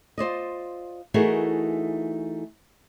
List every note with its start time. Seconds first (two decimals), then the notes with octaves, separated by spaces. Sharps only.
0.18 F4 C5 D5 D#5
1.14 E3 A3 D#4 F#4 G#4 A#4